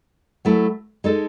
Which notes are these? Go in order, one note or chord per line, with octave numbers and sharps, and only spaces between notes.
F#3 A3 E4
G#3 D#4 A4